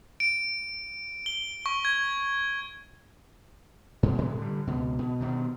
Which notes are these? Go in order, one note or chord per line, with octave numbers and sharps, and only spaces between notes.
D7
G7
C#6
G#6
G2 B2 D3
A2 C3 F#3 G#3
D3 G3
C#2 B2
B2
G2 B2 D#3